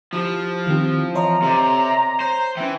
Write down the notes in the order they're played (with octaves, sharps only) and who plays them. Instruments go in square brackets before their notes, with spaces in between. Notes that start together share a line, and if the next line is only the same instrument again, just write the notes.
[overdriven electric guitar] F3 [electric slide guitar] E4 G4
[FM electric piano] D#3 G4 [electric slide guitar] C4 E4
[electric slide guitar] E3 [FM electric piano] C#5 D#5 C6 [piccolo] A#5
[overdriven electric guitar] C3 [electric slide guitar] A4 D5
[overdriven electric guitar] C5 [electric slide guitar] C#5
[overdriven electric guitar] E3 [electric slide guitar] C#4 G5